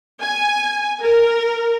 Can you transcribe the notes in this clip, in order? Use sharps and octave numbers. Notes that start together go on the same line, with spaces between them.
G#5
A#4